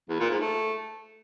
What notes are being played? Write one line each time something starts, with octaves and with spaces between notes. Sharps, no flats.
E2
A#2
G#2
A3